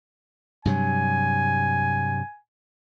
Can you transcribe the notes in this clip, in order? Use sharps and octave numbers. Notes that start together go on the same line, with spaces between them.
G2 C3 F#3 G#5